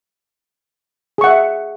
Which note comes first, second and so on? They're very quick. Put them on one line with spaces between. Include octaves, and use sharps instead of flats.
G#4 C#6 F#5 E5